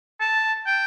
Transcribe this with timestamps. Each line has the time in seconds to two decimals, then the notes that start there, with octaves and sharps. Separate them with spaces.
0.20 A5
0.66 G5